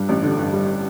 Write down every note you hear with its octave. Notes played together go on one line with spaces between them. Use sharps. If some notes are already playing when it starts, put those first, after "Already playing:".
Already playing: G2 G3
A1
D3
G2
G3